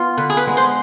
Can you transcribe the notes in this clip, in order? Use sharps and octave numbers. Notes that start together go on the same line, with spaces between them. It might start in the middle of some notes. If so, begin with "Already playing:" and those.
Already playing: B3 F4
D3 B4
G#4
B4
G#3 B3
C5